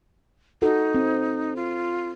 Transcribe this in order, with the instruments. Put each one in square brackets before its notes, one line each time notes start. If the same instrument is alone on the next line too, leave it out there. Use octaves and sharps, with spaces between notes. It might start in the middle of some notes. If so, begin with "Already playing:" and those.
[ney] D#4 [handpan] F#4 A4
[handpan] C4
[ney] F4